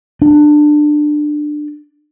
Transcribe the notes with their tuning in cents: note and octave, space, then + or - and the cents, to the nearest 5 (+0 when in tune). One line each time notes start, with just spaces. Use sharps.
D4 +20